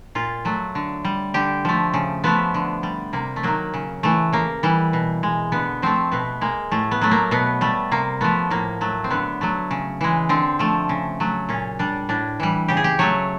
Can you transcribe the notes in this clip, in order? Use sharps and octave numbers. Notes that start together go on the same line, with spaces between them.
A#2 F4
F#3 A3
D3
G3
D3 G4
F3 A3
C#3
F3 A3 B3
D3
G3
C3 A#3
A3
D#3 F#3 A#3
C#3
E3 A3
C#3 A#3
E3 G3
B2
G#3
D3 B3
F3 A3 C4
B2 B3
G#3 A#3
A2 A3
B3
F#3 A3
A#3
B2 B3
G3 A3
C3 A#3
F3 A3 B3
A2 A#3
F#3 A3
C4
D3 B3
F#3 A3
C#3
E3 G#3
D3 C4
F3 A3
C#3
F#3 A3
A#2 C#4
G3 D4
A2 D4
E3 G3
C#3 G4
G#4
G4
F#3 A3 C#5